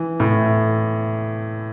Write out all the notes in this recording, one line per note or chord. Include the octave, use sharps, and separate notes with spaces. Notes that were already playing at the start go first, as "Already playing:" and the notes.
Already playing: E3
A2